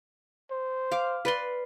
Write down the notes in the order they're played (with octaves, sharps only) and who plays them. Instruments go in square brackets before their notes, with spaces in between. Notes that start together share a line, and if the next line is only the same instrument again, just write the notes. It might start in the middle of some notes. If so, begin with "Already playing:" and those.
[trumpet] C5
[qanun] F5 D6
B4 D5 C6